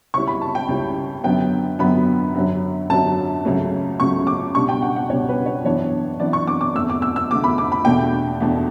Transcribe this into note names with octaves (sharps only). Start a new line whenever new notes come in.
C#2 C#3 G3 C#4 E4 C#6
B5
A5
G5
C#2 C#3 G3 C#4 E4
F#2 D3 F#3 B3 G5
F#2 D3 F#3 B3 B5
F#2 D3 F#3
F#2 D3 F#3 A5
C#2 C#3 F#3 A3
C#2 C#3 F#3 A3 C#6
D6
C#2 B2 G3 D4 C#6
G5
F#5
F#5
C#2 B2 G3 D4 C#5
B4
C#5
F#2 E3 B3 D4 C#5
F#2 E3 B3 D4 D5
C#6
D6
D6
E2 D3 A3 E6
D6
E6
E6
E2 D3 A3 D6
B5
D6
B5
E2 B2 A3 D4 G5
E2 B2 A3 D4